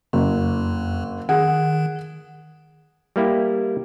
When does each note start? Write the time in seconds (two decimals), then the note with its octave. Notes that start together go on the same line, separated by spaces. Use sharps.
0.13 F#1 F2
1.29 D#3 G#4 F#5
3.16 G3 A#3 E4 G4